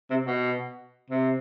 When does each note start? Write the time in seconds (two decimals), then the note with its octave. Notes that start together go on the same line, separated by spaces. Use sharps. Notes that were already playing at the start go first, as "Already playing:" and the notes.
0.10 C3
0.27 B2
1.10 C3